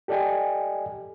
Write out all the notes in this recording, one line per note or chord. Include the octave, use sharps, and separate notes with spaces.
G4 A4 D5 D#5 G5 G#5